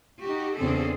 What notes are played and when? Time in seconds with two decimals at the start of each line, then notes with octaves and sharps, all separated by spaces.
0.23 D#4 F#4 G4
0.60 E2 C#3 C4 D4 G#4 A4